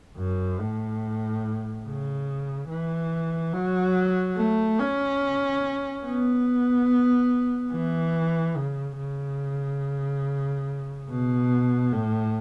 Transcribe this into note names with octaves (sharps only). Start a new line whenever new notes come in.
F#2
A2
C#3
E3
F#3
A3
C#4
B3
E3
C#3
C#3
B2
A2